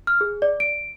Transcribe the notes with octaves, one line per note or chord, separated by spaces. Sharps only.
F6
G#4
D5
D7